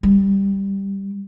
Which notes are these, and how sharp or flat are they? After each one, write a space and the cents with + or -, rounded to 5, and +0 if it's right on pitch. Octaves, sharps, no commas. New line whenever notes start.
G3 +5